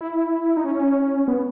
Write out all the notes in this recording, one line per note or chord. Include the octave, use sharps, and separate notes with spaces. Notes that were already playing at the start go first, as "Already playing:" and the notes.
E4
D#4
C#4
B3